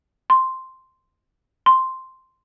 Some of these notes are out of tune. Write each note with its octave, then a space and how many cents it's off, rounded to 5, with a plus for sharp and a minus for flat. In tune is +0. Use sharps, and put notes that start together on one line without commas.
C6 +0
C6 +0